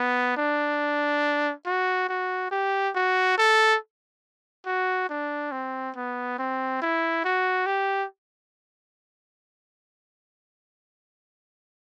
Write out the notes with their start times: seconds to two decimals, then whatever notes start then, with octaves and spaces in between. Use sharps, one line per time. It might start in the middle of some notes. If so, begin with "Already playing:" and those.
Already playing: B3
0.37 D4
1.66 F#4
2.09 F#4
2.51 G4
2.95 F#4
3.38 A4
4.66 F#4
5.09 D4
5.52 C4
5.96 B3
6.38 C4
6.81 E4
7.24 F#4
7.66 G4